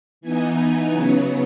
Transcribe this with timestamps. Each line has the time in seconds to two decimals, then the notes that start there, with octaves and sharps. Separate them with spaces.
0.21 E3 B3 D#4 G#5
0.57 G#5
0.90 C#3 F#3 B3